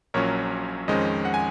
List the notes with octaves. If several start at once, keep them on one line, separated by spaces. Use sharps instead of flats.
A#1 A#2 F#3 C#4 A#4 C#5
F2 D#3 G#3 C#4 C5 D#5
F#5
G#5